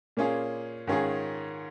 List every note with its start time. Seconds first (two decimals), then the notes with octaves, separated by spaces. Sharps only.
0.17 A#2 A#3 C#4 F4 G#4
0.87 G#2 D#3 C#4 F4 G#4